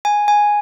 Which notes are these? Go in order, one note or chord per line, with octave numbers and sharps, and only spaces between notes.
G#5
G#5